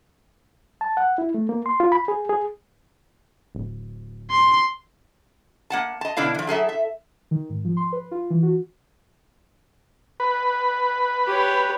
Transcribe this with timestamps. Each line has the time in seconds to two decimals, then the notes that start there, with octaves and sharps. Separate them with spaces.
0.81 A5
0.97 F#5
1.18 E4
1.34 A3
1.49 A#3
1.66 C6
1.80 F4
1.92 B5
2.08 G#4
2.29 G#4
3.55 D1
4.31 C6
5.70 A#3 F#5 A5
6.01 D#5 A5
6.17 B2 D3 D4 E4 F5
6.34 E3 F3
6.47 F#3 G#4 A4 E5
6.69 E5
7.31 D#3
7.50 G#2
7.64 F3
7.77 C6
7.92 B4
8.11 F4
8.30 E3
8.43 F#4
10.20 B4
11.27 G4 C#5